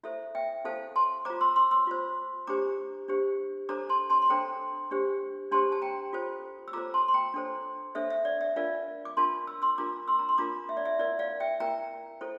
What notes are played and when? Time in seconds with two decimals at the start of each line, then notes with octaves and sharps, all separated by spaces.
0.03 E4 A4 C5 E5
0.35 E5 G5
0.65 E4 A4 C5 F5 A5
0.96 A5 C6
1.25 F4 C5 A#5 D6
1.41 C6 E6
1.56 C6 E6
1.71 C6 E6
1.87 F4 C5
2.47 D4 G4 C5 A#5 D6
3.08 D4 G4 C5
3.69 D4 A4 C5 A#5 D6
3.90 A5 C6
4.10 A5 C6
4.22 C6
4.30 D4 A4 C5 G5 A#5
4.91 D4 G4 C5
5.52 D4 G4 C5 A5 C6
5.72 A5
5.82 G5 A#5
6.13 F4 A4 C5
6.68 E6
6.73 F4 A4 C5 A#5 D6
6.94 A5 C6
7.08 C6
7.14 G5 A#5
7.34 D4 A4 C5
7.95 D4 A4 C5 E5
8.10 E5
8.25 D5
8.41 E5
8.56 D4 F4 A#4 D5 F5
9.05 D6
9.17 D4 F4 A#4 A5 C6
9.47 E6
9.62 C6 E6
9.78 D4 F4 A#4 A#5 D6
10.08 C6 E6
10.19 A#5
10.29 C6
10.38 D4 F4 A#4 A#5 D6
10.69 E5
10.77 D5
10.85 E5
10.99 E4 A#4 D5
11.19 D5 F5
11.40 E5 G5
11.60 E4 A#4 G5 A#5
12.21 E4 A4 C5